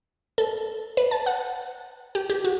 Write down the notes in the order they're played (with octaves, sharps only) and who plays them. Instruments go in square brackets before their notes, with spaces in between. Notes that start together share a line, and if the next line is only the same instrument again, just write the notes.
[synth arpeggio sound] A4
B4
A5
F#5
G4
G4
F#4